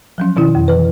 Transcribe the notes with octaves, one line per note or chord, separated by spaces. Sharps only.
F3 F#3 C#4
B2 D#3 C#4 E4
F2
E3 B4